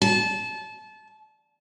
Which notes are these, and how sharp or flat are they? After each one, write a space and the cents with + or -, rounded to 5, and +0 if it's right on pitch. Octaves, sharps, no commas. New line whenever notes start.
A5 -25